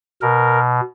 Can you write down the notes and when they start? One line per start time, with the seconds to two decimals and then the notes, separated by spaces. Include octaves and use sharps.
0.22 B2 A#4